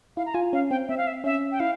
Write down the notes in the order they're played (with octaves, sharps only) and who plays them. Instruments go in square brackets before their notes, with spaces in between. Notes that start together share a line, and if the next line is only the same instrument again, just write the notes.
[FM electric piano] E4 [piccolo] F5
[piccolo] A#5
[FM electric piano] F4 [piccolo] G#5
[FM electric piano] C#4 [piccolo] F5
[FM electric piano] C4 [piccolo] G5
[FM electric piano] C4 [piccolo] E5
[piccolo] F5
E5
[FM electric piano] C#4 [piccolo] E5
[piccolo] G5
[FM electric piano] E4 [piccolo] F5